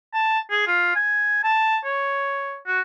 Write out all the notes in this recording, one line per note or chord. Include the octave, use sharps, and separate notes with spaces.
A5
G#4
F4
G#5
A5
C#5
F#4